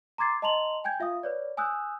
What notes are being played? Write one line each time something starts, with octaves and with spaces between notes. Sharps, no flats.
A#5 C6 D6 G#6 A6 C7
D#5 A5 A#5 C6 F7 F#7
G5 G#5 G6 G#6
F4 E5 F5 D#6
B4 C#5 D5
G#5 D#6 E6 F#6 G6